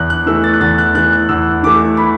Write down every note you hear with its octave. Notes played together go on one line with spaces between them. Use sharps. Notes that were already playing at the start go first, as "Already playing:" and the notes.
Already playing: E2 F#6
F#6
E3 A3 E6
A6
F#6
E2 A6
F#6
E3 A3 F#6
F#6
E2 E6
E3 A3 D6
B5